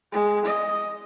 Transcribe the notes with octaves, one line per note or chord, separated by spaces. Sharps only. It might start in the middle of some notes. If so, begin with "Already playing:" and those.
G#3
D#5